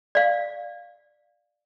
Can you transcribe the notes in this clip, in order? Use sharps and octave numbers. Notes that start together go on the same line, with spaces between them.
D5 F5